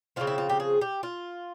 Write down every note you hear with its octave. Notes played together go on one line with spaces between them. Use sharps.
C#3 F3 G#3 C4 F4
E4
F4
G4
G#4
G4
F4